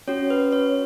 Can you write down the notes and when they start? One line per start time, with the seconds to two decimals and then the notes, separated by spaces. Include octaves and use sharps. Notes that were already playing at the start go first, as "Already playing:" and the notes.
0.08 C#4 F#4 C#5
0.30 B4
0.52 C#5